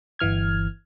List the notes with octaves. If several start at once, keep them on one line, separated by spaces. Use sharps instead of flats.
G1 E3 F6 G#6